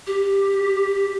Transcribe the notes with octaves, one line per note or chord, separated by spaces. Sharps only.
G4